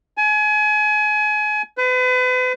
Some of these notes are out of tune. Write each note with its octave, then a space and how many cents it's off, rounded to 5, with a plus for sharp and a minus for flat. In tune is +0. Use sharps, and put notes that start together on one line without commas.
G#5 +30
B4 +40